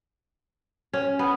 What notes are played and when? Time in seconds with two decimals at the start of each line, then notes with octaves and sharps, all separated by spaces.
0.93 C#4
1.19 B3